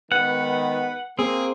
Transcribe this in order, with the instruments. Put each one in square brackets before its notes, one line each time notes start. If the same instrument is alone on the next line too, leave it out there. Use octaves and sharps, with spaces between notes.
[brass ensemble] D#3 G#3 B3 [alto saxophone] B4 [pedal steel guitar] F#5
[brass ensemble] A#3 [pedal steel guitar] C4 [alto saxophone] G#4